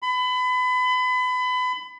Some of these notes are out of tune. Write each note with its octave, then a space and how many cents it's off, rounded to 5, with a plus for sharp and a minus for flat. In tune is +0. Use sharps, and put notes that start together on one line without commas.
B5 +30